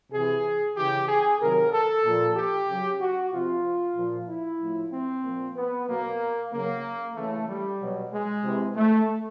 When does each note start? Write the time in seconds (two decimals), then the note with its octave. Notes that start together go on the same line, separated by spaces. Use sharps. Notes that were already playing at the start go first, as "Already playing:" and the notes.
0.12 C3 E3 G#4
0.76 C#3 E3 G4
1.08 G#4
1.40 C3 D#3 F#3 A#4
1.72 A4
2.04 A#2 F3
2.36 G4
2.67 C#3 F#3
2.99 F#4
3.32 C3 F3 F4
3.95 A#2 F3
4.27 E4
4.59 A2 F3
4.91 C4
5.23 A#2 F3
5.55 B3
5.87 B2 F#3 A#3
6.51 C#3 F#3 A#3
7.15 C#3 E3 A3
7.46 G3
7.79 B2 F#3
8.11 G#3
8.43 C3 E3
8.75 A3